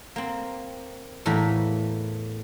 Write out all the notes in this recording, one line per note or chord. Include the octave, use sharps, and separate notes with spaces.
A#3 C4
E2 A2 E3 A#3 A#5 B5